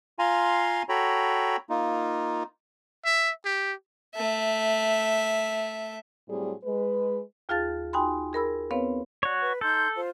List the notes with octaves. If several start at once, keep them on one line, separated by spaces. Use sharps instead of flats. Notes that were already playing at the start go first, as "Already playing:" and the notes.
F4 F5 G#5 A#5 C6
F#4 A4 C#5 G5 A#5 B5
A#3 D#4 F4
E5
G4
A3 E5
A2 F#3 G3 C4 G#4
G#3 B4
D#2 F4 G#4 F5 A5 A6
D#4 F#4 G5 G#5 B5 C6
G#4 A#4 B5 E6
B3 C4 B4 C#5 F5
F#4 C#5 D5
B4
D#4 A4 C6 G6
F4 C5